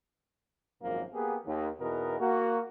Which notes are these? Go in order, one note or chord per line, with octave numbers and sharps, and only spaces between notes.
G#1 F#2 A#2 F3 A#3
A#3 B3 G4 G#4
D#2
E2 B2 B3 D#4 A#4
A#3 F#4